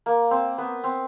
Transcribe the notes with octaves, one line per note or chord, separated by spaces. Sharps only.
A#3
C4
B3
C4